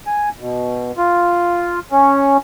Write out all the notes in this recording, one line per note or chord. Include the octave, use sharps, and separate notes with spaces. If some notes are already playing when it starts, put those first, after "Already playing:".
G#5
B2
F4
C#4